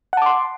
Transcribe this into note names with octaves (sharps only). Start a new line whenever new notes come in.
F#5 A5 C6 D6